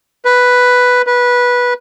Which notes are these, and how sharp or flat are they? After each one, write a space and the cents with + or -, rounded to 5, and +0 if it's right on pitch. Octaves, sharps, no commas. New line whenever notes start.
B4 +0
B4 -15